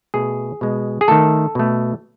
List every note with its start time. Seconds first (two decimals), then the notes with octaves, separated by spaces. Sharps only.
0.14 B2 A3 G#4
0.61 B2 G#3
1.01 G#4
1.08 D#3 A3 A4
1.55 B2 A3